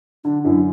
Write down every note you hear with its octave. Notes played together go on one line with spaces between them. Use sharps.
D3 D4
F#2 E4